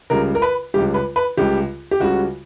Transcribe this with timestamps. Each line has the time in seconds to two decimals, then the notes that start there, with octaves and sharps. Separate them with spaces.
0.10 C#2 C#3 G3 A#4
0.35 A#4
0.42 B4
0.74 C#2 C#3 G3 G4
0.94 B4
1.16 B4
1.37 C#2 C#3 G3 G4
1.91 G4
2.00 C#2 C#3 G3 F#4